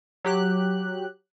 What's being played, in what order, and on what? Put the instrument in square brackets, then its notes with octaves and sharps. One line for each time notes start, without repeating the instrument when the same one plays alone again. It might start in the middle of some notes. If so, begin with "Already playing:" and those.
[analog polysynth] F#3 G4 F#6